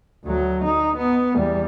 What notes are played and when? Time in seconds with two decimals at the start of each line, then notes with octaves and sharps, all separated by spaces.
0.25 D2 F#3
0.65 D#4
0.97 B3
1.36 E2 G3